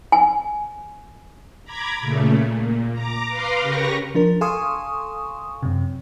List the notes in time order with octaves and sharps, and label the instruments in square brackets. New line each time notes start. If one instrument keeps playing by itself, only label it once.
[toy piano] G#5
[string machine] A#5 B5 D6 G#6
A#2 C#3 A3
A#2
A#5 D6
B4 F5 A#5 C6 D6
C#3 G4 A#4 B4 C#6 A#6
[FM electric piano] F3 D4 A#4
A4 F5 G#5 C6 C#6 D#6
F#2 C3